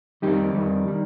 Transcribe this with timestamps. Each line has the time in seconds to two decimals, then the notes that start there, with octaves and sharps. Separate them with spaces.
0.22 F2 D#3 G3 D#4 G4
0.54 F2 D#3 G3
0.87 D#3 G3